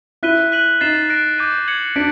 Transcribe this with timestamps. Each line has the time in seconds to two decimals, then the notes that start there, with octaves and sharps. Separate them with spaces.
0.23 E4 F#6 B6 D#7 G7
0.52 F#6 B6 D#7 F#7
0.81 D#4 A6 C7 E7 G7
1.09 F#6 A#6 D7
1.38 D6 G6 A#6 D#7
1.68 G#6 C#7 F#7
1.96 D4 B6 D7